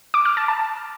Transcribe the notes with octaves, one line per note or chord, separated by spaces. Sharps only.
D6
F6
A5
A5